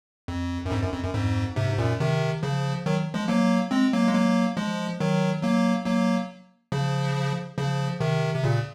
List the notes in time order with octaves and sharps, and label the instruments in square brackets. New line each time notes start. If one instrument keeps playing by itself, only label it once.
[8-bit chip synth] F2
F#2
F2 G#2
F#2
F2
F#2
F2 G#2
G#2 C3
G#2
F#2 A#2
C3 D#3
C#3 F3
D#3 F#3
F3 G#3
F#3 A#3
G#3 C4
F#3 A#3
G#3
F#3 A#3
F3 G#3
D#3 F#3
F#3 A#3
F#3 A#3
C#3 F3
C#3 F3
C3 D#3
C3
A#2 C#3